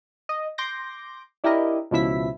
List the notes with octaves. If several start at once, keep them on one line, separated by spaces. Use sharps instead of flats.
D#5
C6 D6 G6 A#6
D4 E4 G4 A#4 D#5
C#2 B2 F3 E4 E5 B6